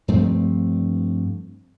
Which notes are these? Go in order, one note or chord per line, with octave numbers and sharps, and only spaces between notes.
G2 F3 A3 C4